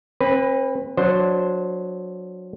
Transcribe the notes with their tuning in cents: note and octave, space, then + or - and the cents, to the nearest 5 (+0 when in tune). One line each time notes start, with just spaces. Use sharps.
C4 +40 B4 +0
F#3 -20 D4 +0 C5 +0